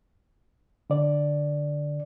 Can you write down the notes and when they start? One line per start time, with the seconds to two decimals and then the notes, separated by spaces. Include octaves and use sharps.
0.90 D3 D5